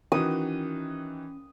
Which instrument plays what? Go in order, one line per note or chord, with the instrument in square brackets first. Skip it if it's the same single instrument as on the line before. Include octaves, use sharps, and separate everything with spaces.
[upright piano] D#3 E3 F#4 [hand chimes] C#4 [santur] D#6